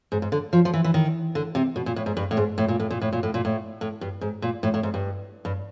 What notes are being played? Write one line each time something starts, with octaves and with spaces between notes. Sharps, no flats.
G#2
G#2
D3
F3
F3
E3
E3
D#3
D3
C3
B2
A#2
A2
G#2
G2
A2
G#2
A2
A#2
A2
A#2
A2
A#2
A2
A#2
A2
A2
G2
G#2
A#2
A2
A2
G#2
G2
G2